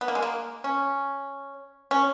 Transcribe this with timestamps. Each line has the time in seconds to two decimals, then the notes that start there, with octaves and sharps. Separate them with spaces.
0.01 B3
0.08 A#3
0.15 G#3
0.22 A#3
0.64 C#4
1.91 C#4